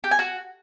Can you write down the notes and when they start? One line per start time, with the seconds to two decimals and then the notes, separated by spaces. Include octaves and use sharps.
0.04 G4
0.11 G#5
0.19 F#4